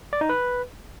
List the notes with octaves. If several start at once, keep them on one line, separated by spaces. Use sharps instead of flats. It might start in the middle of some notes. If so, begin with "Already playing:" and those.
D5
D#4
B4